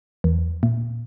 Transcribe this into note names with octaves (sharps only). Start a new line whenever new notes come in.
E2
A#2